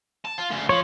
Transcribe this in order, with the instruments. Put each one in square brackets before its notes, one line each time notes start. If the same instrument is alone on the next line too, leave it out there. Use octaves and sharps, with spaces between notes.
[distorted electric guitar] A5
F4
D2 C#3
[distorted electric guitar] F3 [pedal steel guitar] C#5